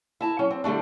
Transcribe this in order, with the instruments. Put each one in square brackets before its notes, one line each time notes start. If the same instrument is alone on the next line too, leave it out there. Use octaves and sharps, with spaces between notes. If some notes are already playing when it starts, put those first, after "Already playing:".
[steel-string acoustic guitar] E4 A5 A#5
F#3 C#4
C4
D3 G3 A3 D4